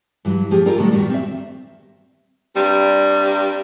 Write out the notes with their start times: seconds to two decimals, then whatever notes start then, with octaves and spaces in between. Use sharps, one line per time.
0.25 G2 E3 F#3
0.50 A2 F3 G4 G#4
0.66 F4 G4 A4 A#4 D5 F5
0.78 A2 C3 D#3 F#3 G3 A3
0.92 E2 G2 A#2 D#3 F#4
1.10 C4 E5
2.55 G2 C3 G3